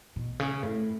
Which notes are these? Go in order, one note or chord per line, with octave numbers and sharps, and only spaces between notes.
B2
C#3
A2